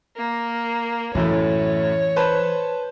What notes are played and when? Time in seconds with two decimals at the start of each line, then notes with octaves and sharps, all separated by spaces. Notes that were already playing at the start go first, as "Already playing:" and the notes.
0.16 A#3
1.15 F#2 A2 E3 A3 C#5
2.16 B4 C5 A5